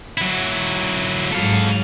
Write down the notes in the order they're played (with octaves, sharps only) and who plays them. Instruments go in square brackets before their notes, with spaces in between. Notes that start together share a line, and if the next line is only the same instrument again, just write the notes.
[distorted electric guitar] F#3 E4
[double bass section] G#2 F#3 [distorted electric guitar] A4 F5